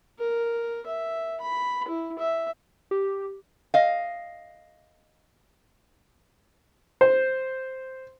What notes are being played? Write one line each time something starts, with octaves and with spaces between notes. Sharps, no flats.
A#4
E5
B5
E4
E5
G4
D#5 F5
C5